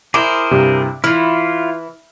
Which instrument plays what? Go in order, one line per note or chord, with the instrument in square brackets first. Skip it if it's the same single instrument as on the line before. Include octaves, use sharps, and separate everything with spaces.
[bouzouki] E4 [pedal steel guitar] G#4 A#4 C5 [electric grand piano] D6
[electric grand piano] G2 C3
[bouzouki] E3 [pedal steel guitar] E4 F4 [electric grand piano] F6